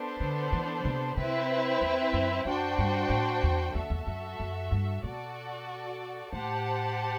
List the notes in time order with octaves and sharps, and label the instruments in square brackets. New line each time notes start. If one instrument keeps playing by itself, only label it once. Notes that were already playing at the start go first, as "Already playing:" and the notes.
Already playing: [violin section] B3 D4 A4 C5
[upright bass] D3
E3
C3
[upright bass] C3 [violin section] C4 E4 B4 E5
[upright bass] E2
F#2
[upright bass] F#2 [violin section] D4 F#4 C5 G5
[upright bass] G2
A2
E2
[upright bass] E2 [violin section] F#4 A4 E5
[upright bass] E2
F#2
F#2
G2
[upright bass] B2 [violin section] F#4 A4 D5
[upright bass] A2 [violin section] G4 C5 F#5 A5